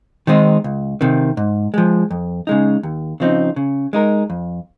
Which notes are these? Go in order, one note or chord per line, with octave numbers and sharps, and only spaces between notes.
D#3 G#3 C4 D#4
C#2
C3 D#3
G#2
F3 G#3
F2
C#3 G#3 D#4
D#2
C#3 F3 C4 D#4
C#3
G#3 D#4 A#4
F2